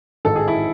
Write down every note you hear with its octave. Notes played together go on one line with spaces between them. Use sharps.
A1 G#2 D#3 A4
G#4
E4